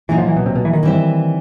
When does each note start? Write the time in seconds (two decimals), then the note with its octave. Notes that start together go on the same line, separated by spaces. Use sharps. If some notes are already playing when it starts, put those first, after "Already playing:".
0.09 A#2 E3 F#3 A#3 D#4
0.18 F3
0.27 E3
0.37 B2
0.46 C3
0.55 B2
0.65 E3
0.73 D#3
0.83 E3 G3 C4 E4